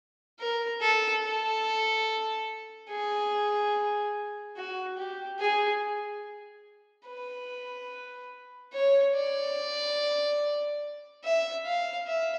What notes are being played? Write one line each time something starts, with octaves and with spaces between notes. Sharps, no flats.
A#4
A4
A4
G#4
F#4
G4
G#4
B4
C#5
D5
E5
F5
E5